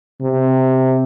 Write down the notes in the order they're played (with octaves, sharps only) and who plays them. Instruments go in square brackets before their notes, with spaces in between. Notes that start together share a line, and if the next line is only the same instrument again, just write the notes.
[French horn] C3